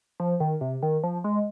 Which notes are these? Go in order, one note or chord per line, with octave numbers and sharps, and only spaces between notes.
F3
D#3
C3
D#3
F3
G#3